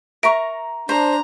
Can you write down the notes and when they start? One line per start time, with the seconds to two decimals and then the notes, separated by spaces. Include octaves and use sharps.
0.23 A#4 E5 A#5 C#6 D7
0.89 D4 C5 A#5